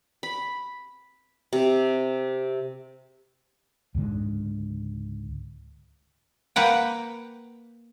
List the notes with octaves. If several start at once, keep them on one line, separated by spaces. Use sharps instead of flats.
B5
C3
C#2 G#2 D3 G#3
A#3 B4 F#5 G5